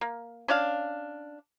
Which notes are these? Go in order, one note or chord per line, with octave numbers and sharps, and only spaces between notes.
A#3
C#4 D4 F5